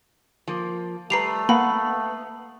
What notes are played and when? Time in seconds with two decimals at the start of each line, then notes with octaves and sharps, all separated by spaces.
0.48 F3 A#3
1.10 G3 A3 B4 A#5 C7 F7
1.49 A#3 B3 F5 F#5 B5